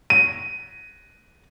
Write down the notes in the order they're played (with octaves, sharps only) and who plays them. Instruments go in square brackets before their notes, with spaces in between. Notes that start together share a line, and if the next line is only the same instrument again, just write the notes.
[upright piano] D#7